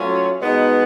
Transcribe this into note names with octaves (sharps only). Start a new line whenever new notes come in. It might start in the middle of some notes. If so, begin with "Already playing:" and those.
Already playing: F#3 A3 C#4 F4
B2 G#3 B3 D#4